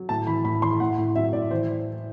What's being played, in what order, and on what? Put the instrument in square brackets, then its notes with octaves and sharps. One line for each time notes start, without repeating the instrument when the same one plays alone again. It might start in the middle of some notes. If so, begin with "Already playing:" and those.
Already playing: [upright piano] F#3
A2 A5
E3 B5
A2 B5
E3 C6
A2 F#5
A2
F#3 E5
A2 D5
E3 C5